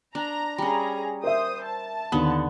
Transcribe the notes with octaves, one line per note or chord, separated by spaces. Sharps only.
D4 A#5
G3 C#4 G#4 A#5
A#4 C5 E5 D#6
A5
D#2 D3 B3 D#6